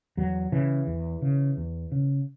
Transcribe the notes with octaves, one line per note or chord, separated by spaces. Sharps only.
E2 F#3
C#3 E3
E2
C#3
E2
C#3